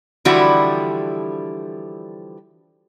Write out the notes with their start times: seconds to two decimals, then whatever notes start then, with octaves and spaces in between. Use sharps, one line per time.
0.25 D3 E3 F3 G3 E4 F#4